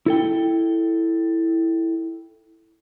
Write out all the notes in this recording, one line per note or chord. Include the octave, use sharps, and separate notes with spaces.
E4 A4 G5